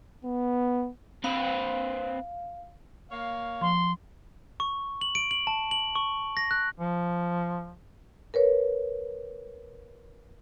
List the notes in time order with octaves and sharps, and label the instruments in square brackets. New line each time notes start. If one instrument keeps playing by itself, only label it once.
[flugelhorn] B3
[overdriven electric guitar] C4 B4 [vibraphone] F5
[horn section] A#3 C#5 F5
[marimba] F3 [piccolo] C6
[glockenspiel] C#6
F#7
D7
F#7
A5
F#7
C#6
A#6
F#6
[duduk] F3
[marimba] A#4 B4 C#5